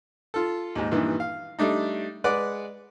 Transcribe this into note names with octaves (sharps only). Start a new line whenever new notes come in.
F4 A4
D#2 G#2
G2 A#2 D#3 E3
F5
G3 A3 D4 D#4
G#3 B4 D5 F#5